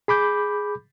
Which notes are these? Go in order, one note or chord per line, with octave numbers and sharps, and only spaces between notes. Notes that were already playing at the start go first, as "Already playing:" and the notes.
G#4 B5 D6 G6